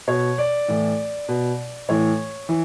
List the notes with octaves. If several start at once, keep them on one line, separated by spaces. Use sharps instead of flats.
B2 C#5
D5
A2 E3
B2
A2 E3 C#5
E3